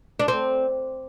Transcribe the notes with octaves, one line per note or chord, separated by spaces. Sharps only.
D4
C4